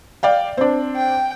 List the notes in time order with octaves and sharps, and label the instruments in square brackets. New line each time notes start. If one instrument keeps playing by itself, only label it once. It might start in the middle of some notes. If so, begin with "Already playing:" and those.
[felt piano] D5 F5 G5
C4 D4
[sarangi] G5